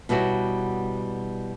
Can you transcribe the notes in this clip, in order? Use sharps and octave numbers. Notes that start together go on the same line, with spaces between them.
B2 G3 E4 F#4 C#5